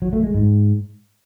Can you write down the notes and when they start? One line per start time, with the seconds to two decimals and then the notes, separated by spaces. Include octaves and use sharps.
0.02 F#3
0.13 A3
0.24 G#3
0.34 G#2